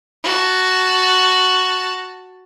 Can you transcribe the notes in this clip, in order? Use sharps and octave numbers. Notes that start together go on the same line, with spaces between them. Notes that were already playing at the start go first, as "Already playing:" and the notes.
F#4 A5